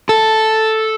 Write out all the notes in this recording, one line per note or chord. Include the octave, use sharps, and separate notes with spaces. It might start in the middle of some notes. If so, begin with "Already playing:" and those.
A4